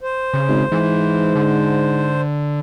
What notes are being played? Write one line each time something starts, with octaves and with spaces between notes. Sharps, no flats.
C5
C#3
G#1
G#2 E3
D3